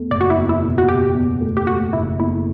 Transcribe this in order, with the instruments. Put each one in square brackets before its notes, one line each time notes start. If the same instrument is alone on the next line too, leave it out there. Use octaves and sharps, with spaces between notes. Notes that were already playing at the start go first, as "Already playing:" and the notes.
Already playing: [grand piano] E2 A3
[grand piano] F#1 [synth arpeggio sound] D5
[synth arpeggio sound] F#4
E4
[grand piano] E2
[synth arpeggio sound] E4
[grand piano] B2
[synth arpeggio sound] F#4
[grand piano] B2 [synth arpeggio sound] G4
[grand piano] E2
A3
[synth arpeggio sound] G4
[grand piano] A3 [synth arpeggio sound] F#4
[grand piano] F#1 [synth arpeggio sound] E4
[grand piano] E2 [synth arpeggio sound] E4